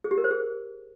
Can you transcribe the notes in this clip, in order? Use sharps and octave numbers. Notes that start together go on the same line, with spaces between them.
G#4
G4
A#4
C5
G#4